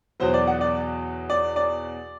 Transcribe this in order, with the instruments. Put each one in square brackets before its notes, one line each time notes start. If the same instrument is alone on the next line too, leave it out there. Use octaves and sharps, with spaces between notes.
[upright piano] E2 B2 F#3 C5
D5
F#5
D5
D5
D5